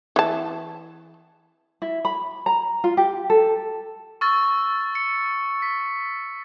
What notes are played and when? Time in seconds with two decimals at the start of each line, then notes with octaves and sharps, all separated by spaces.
0.16 E3 A5
1.82 E4
2.05 B5
2.46 A#5
2.84 F4
2.97 G4
3.30 A4
4.21 C#6 E6 F6 A6
4.95 C#7
5.62 B6